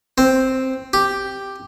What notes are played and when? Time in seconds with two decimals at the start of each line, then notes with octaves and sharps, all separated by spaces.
0.18 C4
0.93 G4